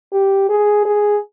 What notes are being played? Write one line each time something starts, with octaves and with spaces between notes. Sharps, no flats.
G4
G#4
G#4